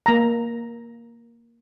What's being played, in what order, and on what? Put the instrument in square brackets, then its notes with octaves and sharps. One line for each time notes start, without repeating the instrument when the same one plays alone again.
[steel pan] A#3 A#5